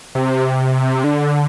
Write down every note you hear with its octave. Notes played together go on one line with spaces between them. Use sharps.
C3
D3